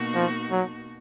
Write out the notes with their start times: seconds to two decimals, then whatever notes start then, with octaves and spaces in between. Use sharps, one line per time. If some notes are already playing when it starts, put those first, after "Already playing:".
Already playing: B2 A#3 D#4 F#4
0.15 F3
0.51 F#3